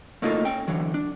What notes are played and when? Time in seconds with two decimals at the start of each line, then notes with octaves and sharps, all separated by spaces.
0.22 A3 A#3 D#4 F4 F#4 A4
0.45 C#4 G5
0.68 D3 E3 F#3
0.94 D4